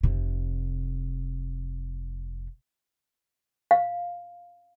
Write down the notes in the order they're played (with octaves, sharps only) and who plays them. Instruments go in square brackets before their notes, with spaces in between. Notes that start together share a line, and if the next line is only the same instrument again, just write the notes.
[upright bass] F1 C3
[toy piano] F5